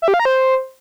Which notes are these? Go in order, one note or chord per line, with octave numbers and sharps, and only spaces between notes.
E5
G4
F5
A#5
C5